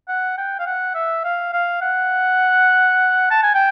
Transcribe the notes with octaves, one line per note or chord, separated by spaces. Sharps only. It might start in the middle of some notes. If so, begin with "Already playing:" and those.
F#5
G5
F5
F#5
E5
F5
F5
F#5
A5
G#5
G5